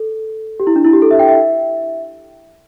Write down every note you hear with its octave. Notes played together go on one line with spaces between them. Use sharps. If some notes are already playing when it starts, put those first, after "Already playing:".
Already playing: A4
G4
E4
D4
E4
G4
A4
E5
G5
E5